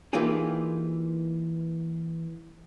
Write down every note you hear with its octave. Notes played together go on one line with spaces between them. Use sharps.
E3 A#3 D#4 F4 G4 G#4